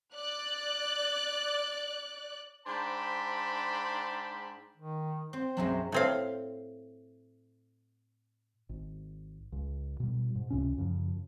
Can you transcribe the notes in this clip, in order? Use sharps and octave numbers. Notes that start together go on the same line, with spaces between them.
D5 F#6
G#2 D4 C5 G5 A5 B5
D#3
C4 C5
B1 F#2 F#3 G#3 C4 E4
A2 C4 F5
G#1
C#2
B2 G3
G#2
C#2 C3 C#4
F#2 C#3 F3